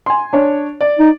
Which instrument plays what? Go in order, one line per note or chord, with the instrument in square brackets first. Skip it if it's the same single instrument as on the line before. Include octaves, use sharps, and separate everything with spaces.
[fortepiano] G#5 C6
D4 C#5
D5
[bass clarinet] D#4